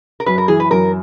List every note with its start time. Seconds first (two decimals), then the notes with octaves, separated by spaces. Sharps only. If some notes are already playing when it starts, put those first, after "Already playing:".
0.20 A#4
0.26 F#2 B4
0.38 A#4
0.48 E3 G#4
0.60 B4
0.71 F#2 A#4